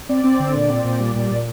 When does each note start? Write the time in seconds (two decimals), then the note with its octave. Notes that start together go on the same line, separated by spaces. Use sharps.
0.09 C4 D5
0.24 C4
0.40 D3
0.55 A#2
0.69 C4
0.85 A#2
1.00 G3
1.15 A#2
1.31 A#2